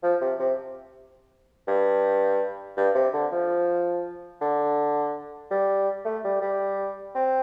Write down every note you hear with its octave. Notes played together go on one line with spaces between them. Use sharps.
F3
C3
C3
G2
G2
C3
D3
F3
D3
G3
A3
G3
G3
C4